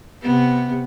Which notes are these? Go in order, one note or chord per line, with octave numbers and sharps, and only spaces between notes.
C3 B3